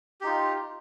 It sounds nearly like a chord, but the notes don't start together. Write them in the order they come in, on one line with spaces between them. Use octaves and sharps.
G4 D#4 F4